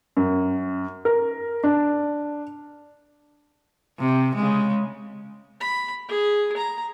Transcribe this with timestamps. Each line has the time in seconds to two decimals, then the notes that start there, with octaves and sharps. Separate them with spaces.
0.17 F#2
1.05 A#4
1.64 D4
4.00 C3
4.35 C#3 G#3
5.61 B5
6.09 G#4
6.57 A#5